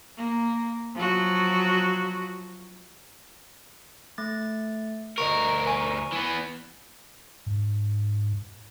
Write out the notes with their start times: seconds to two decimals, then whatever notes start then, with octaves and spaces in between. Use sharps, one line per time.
0.17 A#3
0.95 F3 F#3 F#4
4.18 A3 A6
5.18 D2 A#4 D#5 C#6
5.67 G#5 C#6
6.13 E3 B3
7.46 G#2